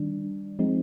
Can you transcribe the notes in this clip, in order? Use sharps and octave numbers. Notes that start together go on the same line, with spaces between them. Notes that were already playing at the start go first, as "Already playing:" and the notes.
Already playing: D#3 G3 D4
F3 G#3 C4 D#4